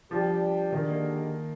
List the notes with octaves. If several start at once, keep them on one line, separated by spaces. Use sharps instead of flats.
F3 G3 D4 G4
D3 D#3 G#3 D4 G4
A#3